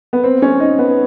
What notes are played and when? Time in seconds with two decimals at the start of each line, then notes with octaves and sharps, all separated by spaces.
0.13 B3
0.24 C4
0.42 C#4
0.60 D#4
0.79 B3